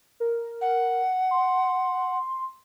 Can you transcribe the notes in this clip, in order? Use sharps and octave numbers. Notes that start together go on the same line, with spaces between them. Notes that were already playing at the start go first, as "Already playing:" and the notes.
A#4
F#5
C6